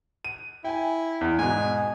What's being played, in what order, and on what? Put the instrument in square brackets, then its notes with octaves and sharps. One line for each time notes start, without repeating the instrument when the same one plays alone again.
[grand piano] D#7
[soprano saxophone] E4 [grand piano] G5 G#5
[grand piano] E2
[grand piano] G#2 B2 [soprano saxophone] G#5